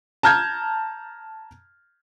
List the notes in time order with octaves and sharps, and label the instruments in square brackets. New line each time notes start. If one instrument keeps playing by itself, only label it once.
[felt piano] A5 A#5 F6 G6 G#6